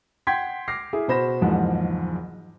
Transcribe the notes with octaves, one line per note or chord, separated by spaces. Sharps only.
F#5 G5 C6 G6 G#6 B6
D6 F6 A#6 C7
E4 G#4
B2 F#4 C5 B5 A#6 E7
F#1 E2 G#2 F3 F#5